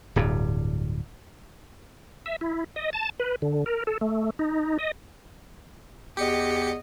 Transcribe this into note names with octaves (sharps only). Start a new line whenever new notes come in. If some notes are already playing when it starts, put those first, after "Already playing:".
D1 G2
E5
E4
D#5
A5
B4
D3
A#4
A4
A3
D#4
D#5
E2 G4 D#5 C#7